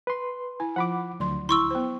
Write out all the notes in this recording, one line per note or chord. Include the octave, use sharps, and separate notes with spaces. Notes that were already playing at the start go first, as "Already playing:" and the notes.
B4 C6
E4 G#5
F3 F4 F#5 B5 D6
D2 F#3 C6
E4 C6 C#6 E6
B3 C5